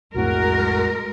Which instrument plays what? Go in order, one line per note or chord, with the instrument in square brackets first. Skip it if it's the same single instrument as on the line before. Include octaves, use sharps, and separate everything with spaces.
[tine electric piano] B1 F2 A2 [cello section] G#3 A#4 [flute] F#4